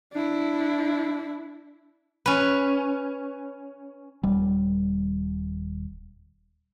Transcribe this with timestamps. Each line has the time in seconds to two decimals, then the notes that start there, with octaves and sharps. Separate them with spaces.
0.13 D4 E4
2.26 C#4 B4
4.23 D#1 G3